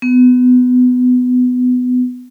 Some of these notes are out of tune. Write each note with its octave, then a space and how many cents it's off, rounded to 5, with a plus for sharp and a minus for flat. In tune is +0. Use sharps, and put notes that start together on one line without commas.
B3 +20